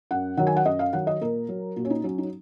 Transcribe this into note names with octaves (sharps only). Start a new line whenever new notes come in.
F#2 F#5
D#3 F#3 F#5
G#5
F#5
F#2 D#5
F5
D#3 F#3 F#5
D#5
A#2 A#4
F#3
A#2 F#4
C#4
D#4
F#3 C#4
D#4